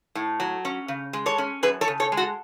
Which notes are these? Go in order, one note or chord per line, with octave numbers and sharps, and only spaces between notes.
A2
F#3
C#4
C#3
G#3
A4 C#5
C#4
F#2 G#4 B4
A4 C#5
C#3
A4 C#5
G#3
F#4 A4